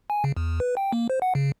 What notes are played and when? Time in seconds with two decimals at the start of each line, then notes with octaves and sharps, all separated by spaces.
0.10 G#5
0.24 C#3
0.37 E2
0.60 B4
0.77 G5
0.93 A#3
1.10 C5
1.22 F#5
1.35 C#3